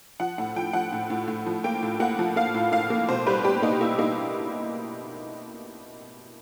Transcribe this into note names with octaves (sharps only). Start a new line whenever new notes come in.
F3 F#5
A2 F#5
F3 G5
F3 F#5
A2
A2
A2
F3
A#3 G5
A2
A#3 F#5
F3
A#3 F5
A2
A2 F5
A#3
B2 C5
G3 B4
G3 G4
A#3 D#4
A#3 E4
A#3 D#4